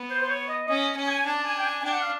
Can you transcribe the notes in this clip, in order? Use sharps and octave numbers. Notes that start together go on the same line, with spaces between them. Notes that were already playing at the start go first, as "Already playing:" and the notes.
Already playing: B3
C5
C5
C#5
D#5
C#4 D#5
C#4
G#5
D4 A5
G#5
G5
G#5
D4 G5
F#5
F5